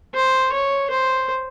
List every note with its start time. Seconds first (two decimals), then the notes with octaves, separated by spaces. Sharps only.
0.14 C5
0.52 C#5
0.90 C5